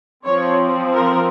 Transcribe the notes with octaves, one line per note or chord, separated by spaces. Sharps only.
F3 C4 C#5
A#4